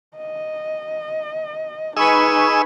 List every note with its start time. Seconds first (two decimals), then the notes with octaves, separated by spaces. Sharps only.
0.17 D#5
1.97 D#4 G#4 B4 D#5 G#5 B5 C#6 E6